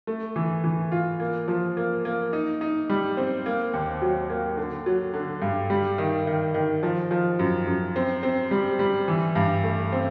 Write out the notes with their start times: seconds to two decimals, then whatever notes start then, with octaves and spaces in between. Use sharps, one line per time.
0.07 A3
0.36 E3
0.64 E3
0.92 F4
1.20 A#3
1.48 F3
1.77 A#3
2.05 A#3
2.33 D#4
2.61 D#4
2.90 G3
3.17 C4
3.46 A#3
3.73 D#2
4.02 F#3
4.29 A#3
4.57 D3
4.86 F#3
5.13 D3
5.42 G2
5.70 G3
5.98 D#3
6.27 D#3
6.54 D#3
6.83 F3
7.11 F3
7.39 F#2
7.67 F#2
7.96 C4
8.23 C4
8.51 G3
8.79 G3
9.08 E3
9.35 G2
9.64 A3
9.92 C4